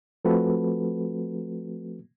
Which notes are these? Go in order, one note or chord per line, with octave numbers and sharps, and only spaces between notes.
F3 A3 C4 F#4 A4 B4